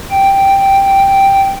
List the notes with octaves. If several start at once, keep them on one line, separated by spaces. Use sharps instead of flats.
G5